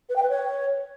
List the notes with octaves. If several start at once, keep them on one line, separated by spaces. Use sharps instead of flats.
B4
G5
B4
C#5